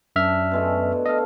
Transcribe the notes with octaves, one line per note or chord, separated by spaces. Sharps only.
F#2 D4 E5 F6
B2 G#3 A3
A4 D#5 F5